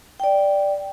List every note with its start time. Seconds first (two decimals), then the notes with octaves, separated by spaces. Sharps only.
0.20 D5 G5